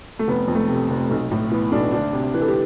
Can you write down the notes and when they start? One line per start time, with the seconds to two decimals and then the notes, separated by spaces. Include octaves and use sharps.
0.19 A3
0.28 F1 B3
0.48 F2
0.55 A3
0.68 C3
0.90 F1
1.10 B1
1.31 A2
1.51 E3 B3
1.72 B1 D4
1.92 D2 D4
2.13 C3
2.34 E3 B4
2.42 A4
2.48 G4